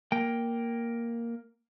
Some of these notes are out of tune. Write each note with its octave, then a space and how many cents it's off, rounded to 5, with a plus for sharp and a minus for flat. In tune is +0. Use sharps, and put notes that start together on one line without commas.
A#3 +0 G5 +0